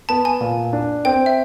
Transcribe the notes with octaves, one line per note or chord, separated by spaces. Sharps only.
B3 A5
G#5
A#2
D4
C4 G5
E5